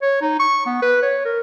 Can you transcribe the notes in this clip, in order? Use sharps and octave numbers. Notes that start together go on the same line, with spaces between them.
C#5
D#4
C#6
B3
B4
C#5
A#4